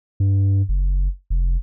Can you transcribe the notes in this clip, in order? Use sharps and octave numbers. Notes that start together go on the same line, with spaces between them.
G2
F#1
F1